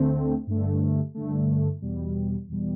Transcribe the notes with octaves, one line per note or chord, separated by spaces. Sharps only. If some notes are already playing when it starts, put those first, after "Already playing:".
Already playing: D2 D3 A3 C4
G2 D3 A3
G2 D3 A3
E2 B2 G3
E2 B2 G3